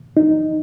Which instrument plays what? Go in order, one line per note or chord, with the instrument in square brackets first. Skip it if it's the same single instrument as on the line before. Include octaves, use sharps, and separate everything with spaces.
[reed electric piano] D#4